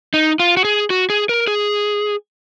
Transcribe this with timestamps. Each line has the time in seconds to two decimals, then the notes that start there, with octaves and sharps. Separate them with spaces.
0.14 D#4
0.40 F4
0.57 F#4
0.65 G#4
0.90 F#4
1.10 G#4
1.29 A#4
1.48 G#4